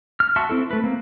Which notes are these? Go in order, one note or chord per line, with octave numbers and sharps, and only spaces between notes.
F6
F#4 E5 A5 C6 C#6
C4 E4 A4
A3 B4
A#3 C4